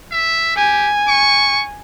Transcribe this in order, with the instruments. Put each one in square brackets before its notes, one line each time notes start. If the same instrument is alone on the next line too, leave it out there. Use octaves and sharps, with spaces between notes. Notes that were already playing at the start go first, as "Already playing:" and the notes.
[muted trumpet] E5
[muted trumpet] G4 [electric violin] G#5
[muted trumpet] C#6